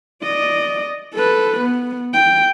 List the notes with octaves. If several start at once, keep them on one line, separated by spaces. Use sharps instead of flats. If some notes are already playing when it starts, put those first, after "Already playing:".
D5 D#5
A4 B4
B3
G5